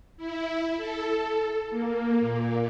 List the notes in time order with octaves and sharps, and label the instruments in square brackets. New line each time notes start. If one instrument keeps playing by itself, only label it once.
[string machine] E4
A4
A#3
A#2